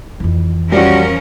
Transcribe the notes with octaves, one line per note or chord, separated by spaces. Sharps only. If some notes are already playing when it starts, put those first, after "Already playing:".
F2 E3
F3 G3 C#4 F#4 A#4